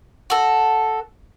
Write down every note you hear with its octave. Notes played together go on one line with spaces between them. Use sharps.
F#4 A4